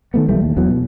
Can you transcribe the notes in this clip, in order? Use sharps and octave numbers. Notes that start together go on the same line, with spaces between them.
D#3 A3 B3
B1 E3 G3 A3
D#2
E2 E3 F#3 B3
B2